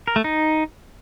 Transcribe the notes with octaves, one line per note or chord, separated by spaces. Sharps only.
A#4
A3
D#4